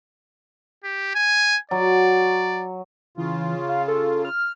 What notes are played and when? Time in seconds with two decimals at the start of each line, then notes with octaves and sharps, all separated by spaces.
0.83 G4
1.15 G#5
1.71 F#3 D5
3.17 C#3 E3 F4
3.69 F5
3.88 A4
4.25 F6